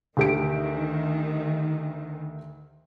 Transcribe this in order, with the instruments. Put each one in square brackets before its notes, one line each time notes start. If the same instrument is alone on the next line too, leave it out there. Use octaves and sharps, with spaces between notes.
[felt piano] D2 G4 D7 [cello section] D#3